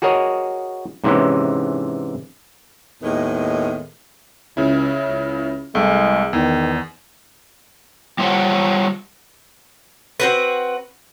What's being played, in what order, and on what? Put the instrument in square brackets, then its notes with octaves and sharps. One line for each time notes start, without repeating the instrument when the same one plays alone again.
[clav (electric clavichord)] F#4 G#4 A#4 C#5 D#5
G#2 C3 E3 G#3 C#4
[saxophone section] D#2 A2 D#3 G#3 B3
[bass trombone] C#2 [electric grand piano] C#3 C#4 E4
[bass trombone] C#2
[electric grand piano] C2 A3 [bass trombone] G#3
[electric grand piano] E2 [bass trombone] D#3
[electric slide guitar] G3 F4 C5 C#5 F#5
[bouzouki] C4 F#4 B4